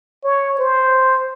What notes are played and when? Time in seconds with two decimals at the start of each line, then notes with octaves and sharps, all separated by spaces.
0.24 C#5
0.59 C5